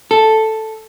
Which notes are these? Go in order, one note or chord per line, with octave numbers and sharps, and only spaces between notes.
A4